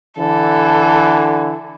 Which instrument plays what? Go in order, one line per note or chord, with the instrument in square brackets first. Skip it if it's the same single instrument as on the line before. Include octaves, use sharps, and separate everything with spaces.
[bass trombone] D3 [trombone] E3 [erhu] A4